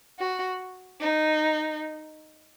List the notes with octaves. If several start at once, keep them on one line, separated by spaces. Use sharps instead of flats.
F#4
D#4